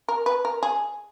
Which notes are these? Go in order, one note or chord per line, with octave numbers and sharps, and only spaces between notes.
A#4
B4
A#4
G#4